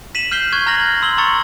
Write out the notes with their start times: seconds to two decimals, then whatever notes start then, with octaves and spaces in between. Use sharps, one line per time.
0.15 B6 D#7 E7 F#7
0.31 F6 G6 C7 G7
0.53 C#6 F#6 G#6
0.66 A#5 F6 A#6 F#7
1.02 C6 E6 F#7 G7
1.18 A#5 C#6 E6 A6 C#7